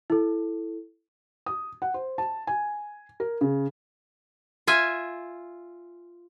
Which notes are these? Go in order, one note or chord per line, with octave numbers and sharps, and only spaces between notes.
E4 A4
D#6
F#5
C5
A5
G#5
A#4
C#3
F4 E5 G#5